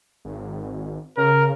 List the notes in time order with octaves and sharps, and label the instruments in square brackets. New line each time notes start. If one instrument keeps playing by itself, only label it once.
[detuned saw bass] G#1
[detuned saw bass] C#3 [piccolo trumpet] A#4